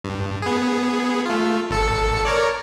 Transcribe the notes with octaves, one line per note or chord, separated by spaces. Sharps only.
G2
B3 G#4
A3 F4
G#1 A4 C#7
A#4 C#5 D5